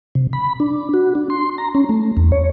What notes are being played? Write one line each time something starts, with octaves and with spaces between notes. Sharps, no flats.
C3
B5
D4
F#4
D4
C6
A#5
C#4
A3
E2
C#5